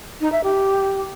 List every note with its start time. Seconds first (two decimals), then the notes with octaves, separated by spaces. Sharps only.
0.21 D#4
0.32 E5
0.43 G4